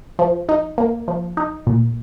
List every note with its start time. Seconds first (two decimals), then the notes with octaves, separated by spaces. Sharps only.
0.19 F3
0.49 D#4
0.78 A#3
1.08 F3
1.37 D#4
1.67 A#2